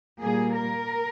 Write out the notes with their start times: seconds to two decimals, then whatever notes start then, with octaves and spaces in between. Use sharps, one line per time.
0.21 A#2 G3 A#3 G#4
0.53 A#4